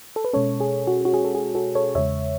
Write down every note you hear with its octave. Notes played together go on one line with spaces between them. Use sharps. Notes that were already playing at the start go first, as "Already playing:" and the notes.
A4
B4
B2 G#3 C#4 A4 C#5
G#4
F#4
F#4
G#4
A4
G#4
F#4 A4
A4 C#5
E2 C#3 G#3 C#5 E5